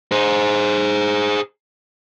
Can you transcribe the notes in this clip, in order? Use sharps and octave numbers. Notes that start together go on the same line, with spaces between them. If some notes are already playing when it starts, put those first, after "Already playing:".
G#4 C5